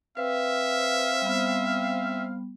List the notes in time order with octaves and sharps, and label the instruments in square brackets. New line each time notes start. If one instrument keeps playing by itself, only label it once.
[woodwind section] C4 F5 [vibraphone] B4 [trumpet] E5
[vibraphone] G3 B3